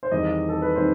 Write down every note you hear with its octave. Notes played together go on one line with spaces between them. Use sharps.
C5
E2 D#3 G3 C4 D#5
A4
B4
D#3 G3 C4 C5